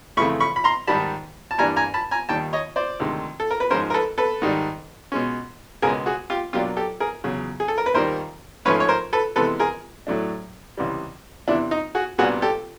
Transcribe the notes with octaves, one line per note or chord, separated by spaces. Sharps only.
F2 C#3 E3 A3 B5 C#6
B5 C#6
B5
A#5 C6
G#2 D#3 G3 A5 B5
A5
G2 E3 G3 A#3 D4 G#5 A#5
G#5 A#5
A5 B5
G#5 A#5
D#2 D#3 G3 G5 A5
C#5 D#5
C5 D5
D2 C3 D#3 G#3
A4
A#4
B4
G#2 F3 G#3 C#4 A#4 C5
A#4
A4 B4
A4 B4
G#2 D#3 G3
B2 G#3 C#4
C#2 B2 G#3 B3 G#4 A#4
F#4 G#4
F4 G4
B2 F#3 A#3 D4 F4 G4
G4 A4
G#4 A#4
E2 C#3 F#3
G#4
A4
A#4
B4
D#2 D#3 G3 A#3 A#4 C5
G#2 F3 A3 C#4 B4 C#5
C#5
A#4 C5
A4 B4
C3 E3 G#3 B3 A4 B4
G#4 A#4
A2 F#3 A3 D4
C#2 C3 E3 G3
E2 C3 E3 D4 E4
D#4
F#4 G#4
C2 A#2 G3 B3 D4 F#4 G#4
G4 A4